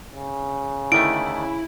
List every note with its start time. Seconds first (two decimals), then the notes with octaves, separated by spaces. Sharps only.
0.13 C#3
0.92 D3 D#3 A3 E4 D7